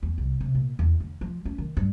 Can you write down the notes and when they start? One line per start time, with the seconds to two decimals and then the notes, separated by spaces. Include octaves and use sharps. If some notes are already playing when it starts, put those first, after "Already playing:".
0.03 E2
0.18 C2
0.41 C3
0.55 A#2
0.79 E2
1.00 D3
1.21 F3
1.45 C#4
1.58 D#3
1.77 G2